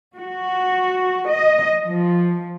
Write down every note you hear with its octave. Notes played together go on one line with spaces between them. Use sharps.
F#4
D#5
F3